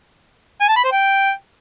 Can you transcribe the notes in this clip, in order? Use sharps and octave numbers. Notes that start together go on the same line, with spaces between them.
G#5
A5
B5
C5
G5